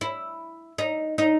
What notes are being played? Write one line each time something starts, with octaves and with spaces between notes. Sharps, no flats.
E4
D#4
D#4